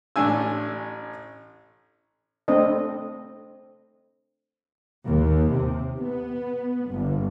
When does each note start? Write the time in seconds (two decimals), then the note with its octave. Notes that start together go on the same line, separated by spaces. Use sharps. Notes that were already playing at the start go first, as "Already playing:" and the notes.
0.16 A1 A3 D4 G#5 E6
2.48 A3 C4 D4 D#5
5.05 D#2
5.50 C3
5.99 B3
6.89 G1